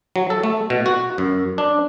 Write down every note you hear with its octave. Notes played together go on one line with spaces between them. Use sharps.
F#3
A4
A3
B2
F#4
F#2
D4